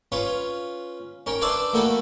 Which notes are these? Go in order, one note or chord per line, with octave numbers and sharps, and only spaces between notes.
C#4 F4 B4
C#4 A#4 G5
D4 B4 C5 D5 E5
A3 A#3 F#4 A4 G5 B5